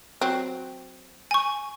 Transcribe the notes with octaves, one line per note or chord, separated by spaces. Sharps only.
F#3 C4
G#5 C#6